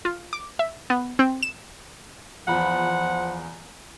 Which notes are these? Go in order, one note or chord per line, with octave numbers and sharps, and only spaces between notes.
F4
D6
E5
B3
C4
E7
E2 F3 F4 F#5 B5